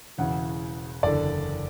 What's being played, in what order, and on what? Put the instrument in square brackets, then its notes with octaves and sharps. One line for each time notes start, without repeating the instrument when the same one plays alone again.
[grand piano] E1 E2 C#3 E3 F#5
F#1 E2 D3 D5